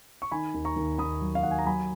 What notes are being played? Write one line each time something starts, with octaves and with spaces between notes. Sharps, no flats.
C#6
D#3 G#5 B5
D#2
A#5 C#6
D#2
D#2 B5 D#6
F#3
F5
D#2 F#5
G#5
A#5
F#3 G#5 B5